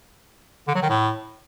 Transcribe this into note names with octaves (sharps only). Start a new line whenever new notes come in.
D3
F#3
D#3
A2